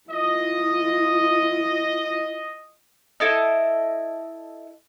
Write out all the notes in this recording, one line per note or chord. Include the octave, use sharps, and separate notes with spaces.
E4 F4 D#5
E4 A4 D#5